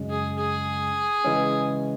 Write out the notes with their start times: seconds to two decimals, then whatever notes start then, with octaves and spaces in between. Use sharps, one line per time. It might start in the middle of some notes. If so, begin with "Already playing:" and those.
Already playing: F#2 C#3 G#3
0.10 G#4
0.38 G#4
1.24 C#3 E3 G#3 C#4